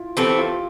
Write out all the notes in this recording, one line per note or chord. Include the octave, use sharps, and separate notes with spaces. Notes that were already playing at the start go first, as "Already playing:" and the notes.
Already playing: E4 F4
E3 A3 C4 G4
F4